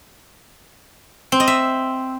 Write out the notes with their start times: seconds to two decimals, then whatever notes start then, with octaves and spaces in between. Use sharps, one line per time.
1.32 C4
1.40 D#5
1.48 E5